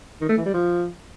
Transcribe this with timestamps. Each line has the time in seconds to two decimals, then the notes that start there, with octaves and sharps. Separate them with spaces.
0.21 D#3
0.29 A3
0.37 E3
0.45 G3
0.54 F3